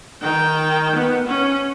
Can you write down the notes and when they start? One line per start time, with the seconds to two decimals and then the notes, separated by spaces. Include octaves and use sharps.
0.22 D#3 G5
0.95 B3
1.27 C#4